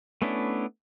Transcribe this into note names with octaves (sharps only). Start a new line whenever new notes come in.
A3 B3 C#4 D4 E4